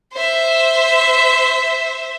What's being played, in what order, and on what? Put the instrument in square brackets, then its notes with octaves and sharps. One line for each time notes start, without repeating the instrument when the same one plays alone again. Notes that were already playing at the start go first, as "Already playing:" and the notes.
[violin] C5 E5